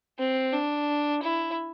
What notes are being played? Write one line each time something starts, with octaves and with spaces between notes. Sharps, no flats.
C4
D4
E4